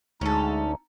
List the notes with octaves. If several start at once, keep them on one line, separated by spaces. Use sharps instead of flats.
D2 G#3 C#4 D#4 A4